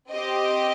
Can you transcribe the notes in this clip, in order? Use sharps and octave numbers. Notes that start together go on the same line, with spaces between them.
C4 G4 D#5